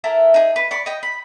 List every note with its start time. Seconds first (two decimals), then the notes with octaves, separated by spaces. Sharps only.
0.04 E4 A4 A#4
0.34 D#4 G#4
0.56 B4
0.71 D5 B5 C#6
0.86 D#5 G5
1.03 B5